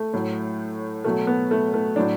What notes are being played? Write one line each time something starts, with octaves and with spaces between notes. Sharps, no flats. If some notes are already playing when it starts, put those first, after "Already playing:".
Already playing: A3
A2 F#3
B2 F#3 A3
B3
A3
A3
A2 F#3 D4